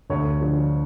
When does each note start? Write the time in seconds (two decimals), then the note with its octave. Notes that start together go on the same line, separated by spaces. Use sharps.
0.10 D2 C#5
0.41 D3 F3